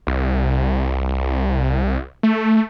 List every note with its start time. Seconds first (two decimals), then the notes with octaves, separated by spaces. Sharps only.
0.07 C2
2.23 A3